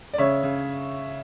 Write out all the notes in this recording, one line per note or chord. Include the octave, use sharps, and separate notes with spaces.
D5
C#3 C#5 E5
C#3